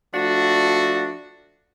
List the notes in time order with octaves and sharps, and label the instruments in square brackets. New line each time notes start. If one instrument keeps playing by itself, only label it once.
[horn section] F3 A3 D4 F#4